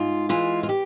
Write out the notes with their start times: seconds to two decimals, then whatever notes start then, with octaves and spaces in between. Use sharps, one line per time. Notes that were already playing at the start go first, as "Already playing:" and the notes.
Already playing: G#2 F4
0.29 E3 G#3 F4
0.63 F4
0.69 G4